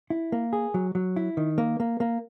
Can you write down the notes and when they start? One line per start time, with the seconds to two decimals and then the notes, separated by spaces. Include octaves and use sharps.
0.10 E4
0.32 A#3
0.53 G#4
0.74 F#3
0.95 F#3
1.16 E4
1.37 D#3
1.58 A#3
1.80 A#3
2.00 A#3